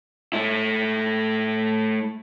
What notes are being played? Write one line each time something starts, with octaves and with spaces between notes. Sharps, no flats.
A3 E4